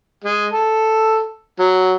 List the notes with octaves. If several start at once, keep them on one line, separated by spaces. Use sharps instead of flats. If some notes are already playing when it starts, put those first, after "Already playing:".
G#3
A4
F#3